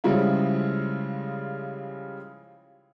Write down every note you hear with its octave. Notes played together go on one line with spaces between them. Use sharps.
C#3 F3 G3 G#3 E4 F4